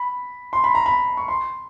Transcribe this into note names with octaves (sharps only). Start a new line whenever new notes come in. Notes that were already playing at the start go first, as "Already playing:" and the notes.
Already playing: B5
C6
B5
A#5
B5
C#6
C6